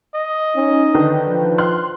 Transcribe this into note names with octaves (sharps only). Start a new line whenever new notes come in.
D#5
C#4 D#4
D3 D#3 D4 B4
F3
C6 F6 F#6